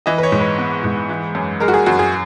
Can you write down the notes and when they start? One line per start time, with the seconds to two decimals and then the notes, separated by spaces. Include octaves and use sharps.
0.06 E3 D#5
0.18 B4
0.23 C#5
0.32 G#2
0.40 B4
0.58 B3
0.84 G#2
1.09 E3
1.35 F#2
1.60 G#3 A#4
1.68 F#4
1.74 G#4
1.86 F#2 F#4
1.99 G#4